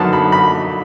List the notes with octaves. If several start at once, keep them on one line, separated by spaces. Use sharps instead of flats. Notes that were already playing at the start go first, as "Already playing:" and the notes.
Already playing: F#2 D3 F#3 B3 D#4 A5
B5
B5